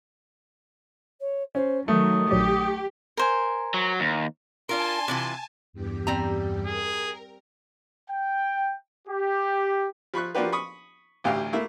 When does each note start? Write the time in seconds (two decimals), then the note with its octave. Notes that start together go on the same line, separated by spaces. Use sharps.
1.20 C#5
1.55 C#4 C5
1.88 D#3 F#3 A3 D#6
2.31 A#1 F#3 G4 D5
3.17 A#4 C5 G#5
3.74 F#3
4.00 D#2
4.69 D4 F4 A#4 G#5 A5 C6
5.08 C3 E3 F4
5.73 E2 G2 G4
6.07 G3 C4 A#5
6.66 G#4 A#4
8.09 G5
9.07 G4
10.14 F3 B5 C#6 F#6
10.35 F3 A#3 D4 F#4 G4 B4
10.52 B5 C#6 D#6
11.24 A1 D2 G4 F5
11.53 A3 A#3 E4